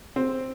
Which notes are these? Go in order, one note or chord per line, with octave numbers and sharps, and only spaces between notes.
C4